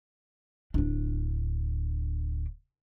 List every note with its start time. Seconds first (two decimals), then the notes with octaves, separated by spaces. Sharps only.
0.74 D1 D4